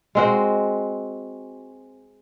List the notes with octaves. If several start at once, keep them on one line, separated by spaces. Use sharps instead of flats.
G#3 C4 F#4